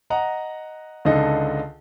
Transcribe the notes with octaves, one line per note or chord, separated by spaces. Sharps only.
D#5 F#5 A#5
C#2 D3 D#4 A4 D#5